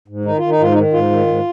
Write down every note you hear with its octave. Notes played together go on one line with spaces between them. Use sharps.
G#2
D#3 D#4
D#3 F4
D#4
G#2 F4
D#4
D#3
G#2 F4
D#3
G#2